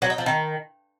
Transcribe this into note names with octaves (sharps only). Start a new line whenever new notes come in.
F#3
D#4
F3
D#3